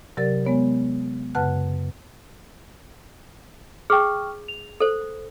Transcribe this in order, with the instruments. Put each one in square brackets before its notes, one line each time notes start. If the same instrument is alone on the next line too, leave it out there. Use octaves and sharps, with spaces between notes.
[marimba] C3 F#3 G4 A#4 D5 A6
G#3 B3 C#5
F#2 C#3 B4 F#5 A5 F#6
[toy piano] G#4 [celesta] G5 C#6 F6
[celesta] F7
[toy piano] A4 C5